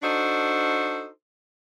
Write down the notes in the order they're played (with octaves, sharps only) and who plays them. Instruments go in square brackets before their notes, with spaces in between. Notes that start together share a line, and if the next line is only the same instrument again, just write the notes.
[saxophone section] D4 D#4 F#4 A4 C5